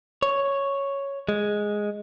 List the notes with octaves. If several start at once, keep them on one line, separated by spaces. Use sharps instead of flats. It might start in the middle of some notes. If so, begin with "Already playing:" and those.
C#5
G#3